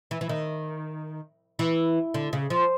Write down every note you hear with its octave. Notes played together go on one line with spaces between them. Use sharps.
E3
E3
D#3
E3
D3
C#3
F3